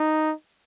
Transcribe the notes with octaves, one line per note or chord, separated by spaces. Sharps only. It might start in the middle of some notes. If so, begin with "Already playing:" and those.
Already playing: D#4